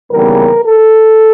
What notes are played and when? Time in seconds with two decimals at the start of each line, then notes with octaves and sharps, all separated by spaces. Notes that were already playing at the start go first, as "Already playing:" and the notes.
0.11 D#2 C#3 E3 G3 B3 A#4
0.65 A4